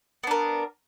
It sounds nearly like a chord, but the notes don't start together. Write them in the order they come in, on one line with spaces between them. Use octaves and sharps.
B3 D4 A#4